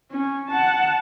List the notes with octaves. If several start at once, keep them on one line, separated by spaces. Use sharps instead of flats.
C#4
F#5 A5